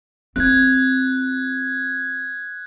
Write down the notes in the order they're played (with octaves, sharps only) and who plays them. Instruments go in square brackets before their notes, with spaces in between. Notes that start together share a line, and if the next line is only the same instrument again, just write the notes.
[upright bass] C4 F4 [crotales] F#6 G#6